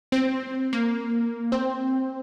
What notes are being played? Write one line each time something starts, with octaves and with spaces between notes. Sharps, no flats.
C4
A#3
C4